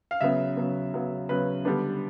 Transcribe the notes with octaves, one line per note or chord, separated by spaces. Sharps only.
F5
C#3 F#3 B3 E5
C#3 F#3 B3
C#3 F#3 B3
C#3 F#3 B3 B4
D3 G3 B3 D4